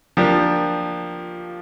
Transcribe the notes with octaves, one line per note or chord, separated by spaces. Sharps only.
F3 A#3 D4 G4 A#4